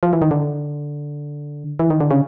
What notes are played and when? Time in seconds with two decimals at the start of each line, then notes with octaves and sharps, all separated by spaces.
0.03 F3
0.13 E3
0.22 D#3
0.31 D3
1.79 E3
1.90 D#3
2.01 D3
2.11 C#3